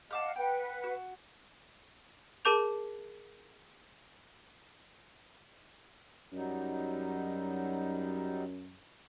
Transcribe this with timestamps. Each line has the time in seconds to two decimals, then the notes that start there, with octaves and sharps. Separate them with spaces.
0.11 D#5 F5 F#5 A5 D6 F6
0.36 B4 F#5 G5
0.84 F#4
2.45 G#4 A#4 A5 D6 G6 F7
6.32 F#2 F#3 G3 D#4